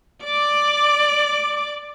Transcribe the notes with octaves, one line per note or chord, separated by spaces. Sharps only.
D5 D6